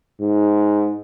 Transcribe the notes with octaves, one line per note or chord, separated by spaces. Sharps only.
G#2